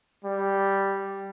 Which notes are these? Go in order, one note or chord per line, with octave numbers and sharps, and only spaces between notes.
G3